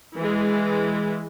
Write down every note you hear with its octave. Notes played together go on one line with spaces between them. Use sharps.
E3 G#3